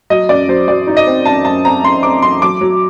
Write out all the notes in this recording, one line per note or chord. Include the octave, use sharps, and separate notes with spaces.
F#3 D#5
F#2 D5
F#3 C5
F#3 D5
D#4
D#5
C4
F#2 A5
F#2 A5
C4 A#5
F#2 C6
C4 D6
F#2 C6
F#3 D6
F#3